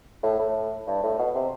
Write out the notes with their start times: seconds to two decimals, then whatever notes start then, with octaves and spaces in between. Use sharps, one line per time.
0.23 A2
0.39 A2
0.87 G2
1.03 A2
1.19 B2
1.35 C3